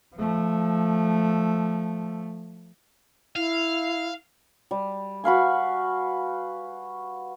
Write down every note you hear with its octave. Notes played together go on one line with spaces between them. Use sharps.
F3 A3
E4 F5
G3
F#4 B4 F5 G#5